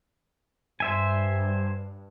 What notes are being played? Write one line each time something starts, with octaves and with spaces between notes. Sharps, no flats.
G2 C5 E5 G#5